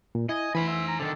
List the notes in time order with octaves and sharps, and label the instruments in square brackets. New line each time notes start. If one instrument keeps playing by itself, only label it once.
[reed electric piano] A#2
[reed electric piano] E4 [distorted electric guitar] D#5 [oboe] G#5
[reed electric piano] E3 [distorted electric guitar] C5 G#5 [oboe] B5
[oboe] E5
A#5
[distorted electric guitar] D3 D#3 [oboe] A4